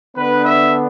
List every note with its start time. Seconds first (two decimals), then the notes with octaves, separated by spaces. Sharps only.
0.17 D3 B3 D4 B4
0.45 E5